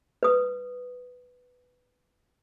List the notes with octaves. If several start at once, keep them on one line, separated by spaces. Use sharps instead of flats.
B4 D#6